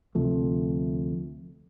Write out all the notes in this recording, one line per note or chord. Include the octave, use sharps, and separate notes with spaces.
D2 C3 F3 A3